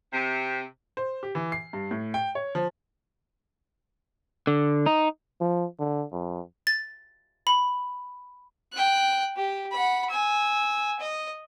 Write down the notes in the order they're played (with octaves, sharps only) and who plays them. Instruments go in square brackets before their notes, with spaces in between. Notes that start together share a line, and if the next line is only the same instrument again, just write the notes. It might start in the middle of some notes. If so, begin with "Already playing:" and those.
[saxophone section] C3
[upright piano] C5
G4
E3
C7
G2
A2
G5
C#5
F3
[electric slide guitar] D3
D#4
[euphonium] F3
D3
F2
[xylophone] A6
B5
[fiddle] G5 F#6
G4
F#5 B5
G#5 E6
D#5